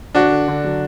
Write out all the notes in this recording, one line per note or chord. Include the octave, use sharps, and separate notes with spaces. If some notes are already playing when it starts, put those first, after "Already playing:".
D3 D4 F#4
D3
D3
F#3